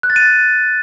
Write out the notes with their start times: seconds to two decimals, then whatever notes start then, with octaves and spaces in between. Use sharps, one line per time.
0.03 F#6
0.10 A6
0.16 D#7